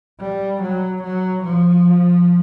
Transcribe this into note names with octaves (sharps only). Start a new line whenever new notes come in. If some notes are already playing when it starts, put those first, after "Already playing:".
G3
F#3
F#3
F3